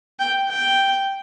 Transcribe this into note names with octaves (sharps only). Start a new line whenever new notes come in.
G5
G5